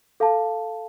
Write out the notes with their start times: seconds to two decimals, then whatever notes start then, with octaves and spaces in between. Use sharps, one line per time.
0.20 A4 F5 A5